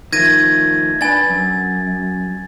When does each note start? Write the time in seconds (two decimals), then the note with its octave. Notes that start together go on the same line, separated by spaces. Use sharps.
0.13 D#3 F3 A3 G#6 A#6 D#7
1.01 D4 B4 G#5 A6
1.30 F#2